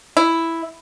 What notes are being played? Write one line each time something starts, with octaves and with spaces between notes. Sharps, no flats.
E4